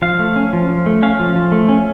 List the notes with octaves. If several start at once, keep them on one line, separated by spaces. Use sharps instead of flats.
F3 F5
A3
C#4
F3
F3
A3
C#4 F5
F3
F3
A3
C#4